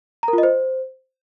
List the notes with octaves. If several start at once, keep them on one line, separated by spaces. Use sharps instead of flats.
A#5
A#4
F4
D#5
C5